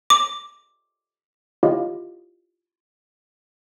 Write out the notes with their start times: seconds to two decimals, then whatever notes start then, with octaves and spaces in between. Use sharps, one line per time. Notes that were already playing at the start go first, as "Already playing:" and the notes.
0.10 D6
1.63 E4 F4 G4 C#5 D#5 F5